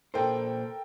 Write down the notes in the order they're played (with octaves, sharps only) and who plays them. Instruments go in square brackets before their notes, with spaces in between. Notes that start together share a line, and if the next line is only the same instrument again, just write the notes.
[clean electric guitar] A#2 C5 [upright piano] A4 A#4 G5